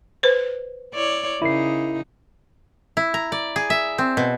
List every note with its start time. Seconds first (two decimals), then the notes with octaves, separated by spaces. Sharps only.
0.23 B4 C5
0.94 E4 C#5 D5
1.42 C#3 D#4 E4 A#4 C7
2.97 E4
3.14 A#5
3.32 D5
3.56 G#4
3.70 E5
3.98 C4
4.17 B2